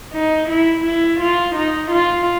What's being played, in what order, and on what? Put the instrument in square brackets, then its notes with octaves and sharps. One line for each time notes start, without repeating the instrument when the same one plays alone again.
[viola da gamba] D#4
E4
E4
F4
D#4
F4